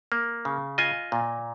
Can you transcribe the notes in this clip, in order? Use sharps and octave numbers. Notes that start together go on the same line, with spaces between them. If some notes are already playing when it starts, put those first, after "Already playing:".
A#3
C#3
F4 D#5 G#5
A#2